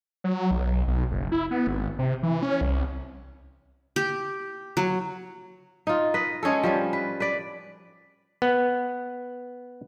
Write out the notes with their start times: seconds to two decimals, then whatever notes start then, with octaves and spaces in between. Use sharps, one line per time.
0.24 F#3
0.51 B1
0.88 B1
1.12 F#1
1.32 E4
1.51 B3
1.67 G#1
1.99 C3
2.23 E3
2.43 C#4
2.61 C2
3.96 G4
4.77 F#3
5.87 D#4 F4
6.14 B4 D#5
6.43 G#3 C#4 G#4 A4
6.63 F3 G3 C#4
6.93 B4
7.20 B4 D5
8.42 B3